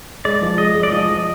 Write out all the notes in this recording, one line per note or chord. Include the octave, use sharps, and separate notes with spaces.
G#3 D5
F3
G#3 D#5
G#3
D5
F3 D#5
F3